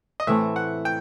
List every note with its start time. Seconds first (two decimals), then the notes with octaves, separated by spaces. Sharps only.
0.20 D#5
0.27 A2 E3 A3 C4 E5
0.56 F#5
0.85 G5